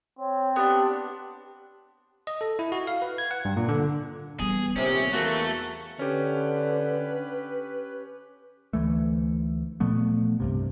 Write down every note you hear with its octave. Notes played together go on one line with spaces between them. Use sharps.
C4 C#5
B3 D4 G4
D#5
A4
E4
F#4
F5
B4
G#6
F#5
G2
A#2
D3
E3 G3 B3 G#4
D#1 C3 B3 C#4
E2 A3 A#3 E4 F#4
D3 C#4 G4 B4
D2 E3 A3
A#2 F3 A3 B3
C2 G2 C3